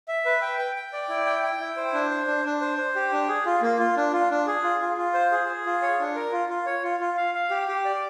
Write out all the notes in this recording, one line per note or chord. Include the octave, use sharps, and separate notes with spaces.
E5
B4
G5
G5
G5
D5
E4
G5
G5
E4
C5
D4
C5
D4
D4
C5
C5
G4
D4
G#4
F4
A#3
F4
D4
F4
D4
G#4
F4
F4
F4
C5
G#4
G#4
F4
C#5
D4
A#4
F4
F4
C#5
F4
F4
F5
F5
G4
G4
D5